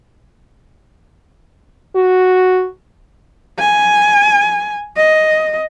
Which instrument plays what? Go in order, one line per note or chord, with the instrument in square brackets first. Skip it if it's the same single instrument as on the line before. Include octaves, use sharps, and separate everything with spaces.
[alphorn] F#4
[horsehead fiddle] G#5
D#5